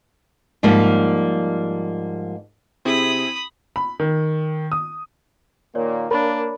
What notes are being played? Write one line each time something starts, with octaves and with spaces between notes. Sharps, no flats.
G#2 F3 G3 A#3
C3 C4 E4 G#4 B5 D#6
B5
D#3
D#6
A#2 D#3 A#3 C#5 D5
A#3 D4 A#4 C#5 B5